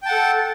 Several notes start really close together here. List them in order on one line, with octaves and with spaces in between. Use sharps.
G5 A5 F#5 A4